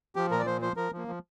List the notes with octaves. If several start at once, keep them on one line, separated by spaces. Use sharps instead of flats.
F3 G4
A#2 A#4
D5
F3 C5
F3 C5
F3 A#4
F3 A#3
F3